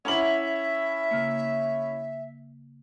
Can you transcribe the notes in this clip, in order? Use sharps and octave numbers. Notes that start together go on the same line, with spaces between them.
C#4 E4 E5 F#5 A#5 D6 F#7
C#3 A#3